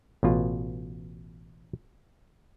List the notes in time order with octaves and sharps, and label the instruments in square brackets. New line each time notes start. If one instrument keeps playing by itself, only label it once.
[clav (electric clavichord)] A1 B2 F4